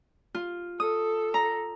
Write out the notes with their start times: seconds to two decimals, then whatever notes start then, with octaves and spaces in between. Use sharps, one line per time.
0.35 F4
0.80 A4 D#6
1.34 A#5